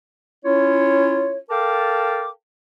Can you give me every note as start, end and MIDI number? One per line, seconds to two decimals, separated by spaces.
0.45 1.37 61
0.45 1.37 64
0.45 1.37 65
0.45 1.37 73
1.50 2.29 69
1.50 2.29 70
1.50 2.29 77
1.50 2.29 79
1.50 2.29 81
1.50 2.29 86